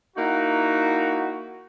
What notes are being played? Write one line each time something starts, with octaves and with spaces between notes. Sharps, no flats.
A#3 D#4 E4 F#4